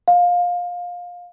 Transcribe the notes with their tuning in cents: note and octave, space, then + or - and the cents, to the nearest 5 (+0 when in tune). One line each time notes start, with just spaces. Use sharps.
F5 +20